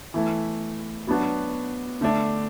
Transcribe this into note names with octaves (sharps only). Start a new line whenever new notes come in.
E3 A3 E4
F#3 B3 D4 F#4
D3 A3 D4